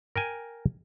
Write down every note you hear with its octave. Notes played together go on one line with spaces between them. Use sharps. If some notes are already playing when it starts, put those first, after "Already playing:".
A#4 G5 G#5